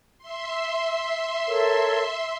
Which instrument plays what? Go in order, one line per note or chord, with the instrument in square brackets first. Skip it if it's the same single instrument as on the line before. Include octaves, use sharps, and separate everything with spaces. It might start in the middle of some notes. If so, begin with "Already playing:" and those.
[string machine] E5 C6
[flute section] A4 A#4 C#5